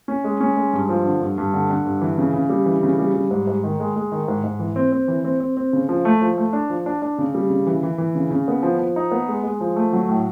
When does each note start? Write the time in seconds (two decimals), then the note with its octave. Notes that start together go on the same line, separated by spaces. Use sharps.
0.08 C#4
0.24 G#3
0.40 C#4
0.57 G#3
0.73 G2
0.89 F3
1.05 D3
1.21 G2
1.38 G2
1.54 D3
1.70 D3
1.85 G2
2.01 E3
2.18 C#3
2.33 C#3
2.50 G3
2.66 E3
2.83 C#3
2.99 G3
3.14 G3
3.31 G#2
3.47 G#2
3.64 D#3
3.80 G#3
3.96 G#3
4.12 D#3
4.28 G#2
4.44 G#2
4.59 E3
4.76 C4
4.92 C4
5.08 E3
5.25 C4
5.40 C4
5.57 C4
5.73 C#3
5.89 F3
6.05 A3
6.21 F3
6.37 A3
6.53 D4
6.70 F3
6.86 D4
7.02 D4
7.18 C#3
7.35 G3
7.50 C#3
7.67 E3
7.83 E3
7.98 E3
8.15 C#3
8.31 C#3
8.48 B3
8.63 F3
8.79 F3
8.96 D#4
9.11 B3
9.28 G#3
9.43 G#3
9.61 F3
9.76 A3
9.93 F#3
10.09 A2